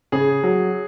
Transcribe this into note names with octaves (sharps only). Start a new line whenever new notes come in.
C#3 G#4
F#3